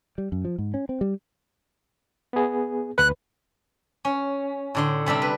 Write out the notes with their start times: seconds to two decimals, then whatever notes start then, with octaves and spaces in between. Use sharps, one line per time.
0.18 G3
0.32 F#2
0.45 F3
0.58 G#2
0.74 C#4
0.89 C4
1.01 G3
2.33 B3 G#4
2.98 D2 B4 F#6
4.05 C#4
4.75 A2 D3 C6
5.06 C3 G3 C4 D4
5.22 B4